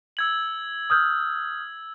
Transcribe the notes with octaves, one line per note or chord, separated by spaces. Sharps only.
E6 G#6 F#7
D#6 F6 G6